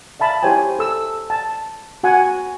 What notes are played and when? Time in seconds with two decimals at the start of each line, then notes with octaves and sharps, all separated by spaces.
0.20 E5 F5 A5 B5
0.43 E4 G4 C5 C#5 G5 G#5
0.79 A4 E6
1.30 A5
2.03 F#4 F#5 G#5